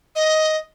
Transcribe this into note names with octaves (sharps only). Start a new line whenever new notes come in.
D#5